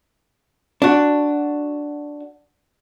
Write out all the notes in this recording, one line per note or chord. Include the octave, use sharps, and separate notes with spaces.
D4 F#4